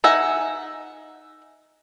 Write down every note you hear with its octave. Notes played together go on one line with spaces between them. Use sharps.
D#4 E5 F#5 G#5